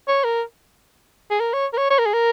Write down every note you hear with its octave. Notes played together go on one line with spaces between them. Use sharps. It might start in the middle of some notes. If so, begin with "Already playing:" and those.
C#5
A#4
G#4
A#4
C#5
A#4
C#5
C#5
A#4
G#4
A#4